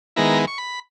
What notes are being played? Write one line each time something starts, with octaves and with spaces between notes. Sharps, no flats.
D#3 G#3 B3 E4 A#5
C#6
B5